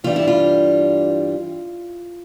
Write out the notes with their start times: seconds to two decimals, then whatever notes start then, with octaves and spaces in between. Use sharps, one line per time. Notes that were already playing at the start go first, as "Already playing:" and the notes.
0.04 G2 E3 G3 D4 F4
0.16 E4
0.27 F4